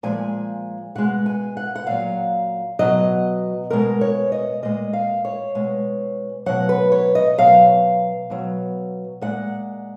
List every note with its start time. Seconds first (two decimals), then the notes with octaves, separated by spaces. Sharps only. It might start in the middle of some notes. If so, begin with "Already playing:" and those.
0.03 A#2 F3 G#3 G#5
0.95 B2 G#3 F#5
1.26 G#5
1.57 F#5
1.75 F#5
1.87 A#2 F#3 F5
2.79 B2 F#3 D#5
3.70 B2 G#3 A#4
4.01 C#5
4.32 D#5
4.63 A#2 G#3 D#5
4.93 F5
5.25 C#5
5.55 B2 G#3
6.46 B2 F#3 F#5
6.69 B4
6.92 C#5
7.15 D#5
7.38 B2 F#3 F5
8.30 B2 F#3
9.21 A#2 G#3 F#5